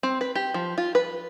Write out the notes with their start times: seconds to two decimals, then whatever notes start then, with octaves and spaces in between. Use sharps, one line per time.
0.03 C4
0.21 B4
0.35 G4
0.54 F3
0.78 F4
0.95 B4